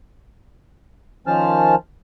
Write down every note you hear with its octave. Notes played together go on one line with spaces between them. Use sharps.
D#3 F3 C#4 C5 A5 F6